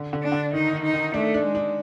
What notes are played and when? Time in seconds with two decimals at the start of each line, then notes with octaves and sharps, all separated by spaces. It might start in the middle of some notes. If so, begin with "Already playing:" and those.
Already playing: D3
0.13 D3
0.22 D4
0.32 D3
0.53 D#3 D#4
0.73 D#3
0.84 D#4
0.94 D#3
1.14 A3 D4
1.34 D4
1.44 G#3
1.55 D4